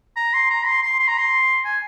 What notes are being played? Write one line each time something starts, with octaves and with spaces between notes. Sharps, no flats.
A#5
C6
A#5
C6
C6
C6
A#5
C6
G#5